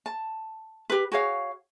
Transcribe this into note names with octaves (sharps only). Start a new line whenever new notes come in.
A5
G4 B4
F#4 G#4 C#5 F5